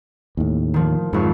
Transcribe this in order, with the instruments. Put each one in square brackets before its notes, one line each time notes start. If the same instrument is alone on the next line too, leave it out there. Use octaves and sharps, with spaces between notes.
[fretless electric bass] D#2 A2
[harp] D#3 F3
[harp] F1 F2 C#6 [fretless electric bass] G#2